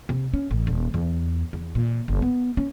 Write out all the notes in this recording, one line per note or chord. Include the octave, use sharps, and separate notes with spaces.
C3
C#4
A1
D#1
E2
E2
A#2
F#1
B3
C#4